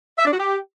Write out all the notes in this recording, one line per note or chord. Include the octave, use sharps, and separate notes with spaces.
E5
D4
F#4
G4